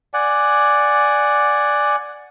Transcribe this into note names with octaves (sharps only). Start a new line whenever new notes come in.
D5 F#5 G#5